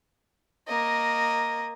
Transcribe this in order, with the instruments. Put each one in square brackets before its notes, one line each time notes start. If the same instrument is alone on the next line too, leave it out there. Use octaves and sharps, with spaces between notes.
[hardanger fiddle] A#3 D#5